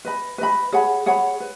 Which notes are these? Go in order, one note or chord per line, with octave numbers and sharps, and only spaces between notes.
B4 D#5 B5
B4 D#5 B5
G#4 C#5 F#5 B5
G#4 C#5 F#5 B5
B4